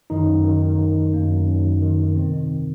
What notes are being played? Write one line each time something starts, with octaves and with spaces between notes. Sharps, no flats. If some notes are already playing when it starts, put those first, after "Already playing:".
F#2 D#3 D#4
F#2
D#3
D#3
D#3
D#3
F#2 A#3
F#2
F#2
F#2
D#3
D#3
C3 D#3 C4
D#3